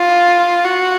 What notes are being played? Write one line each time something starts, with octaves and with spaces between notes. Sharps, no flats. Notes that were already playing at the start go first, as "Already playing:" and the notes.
Already playing: F4
F#4